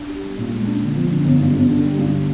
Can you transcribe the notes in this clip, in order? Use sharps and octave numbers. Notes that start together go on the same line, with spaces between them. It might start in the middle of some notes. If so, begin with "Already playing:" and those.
Already playing: D4
G4
G3
A#2
G#3
D4
D3
F2
D3
G1
G2
G1
D3
G3
G2